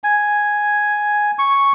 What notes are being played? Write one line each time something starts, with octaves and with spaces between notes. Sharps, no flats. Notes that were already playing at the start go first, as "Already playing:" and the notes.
G#5
C#6